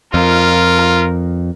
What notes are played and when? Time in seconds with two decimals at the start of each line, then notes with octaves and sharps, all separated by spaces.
0.14 F2 F4 A#4